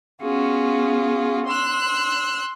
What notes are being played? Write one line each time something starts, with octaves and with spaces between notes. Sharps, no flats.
B3 C#4 F4 F#4 G#4
C6 E6 F#6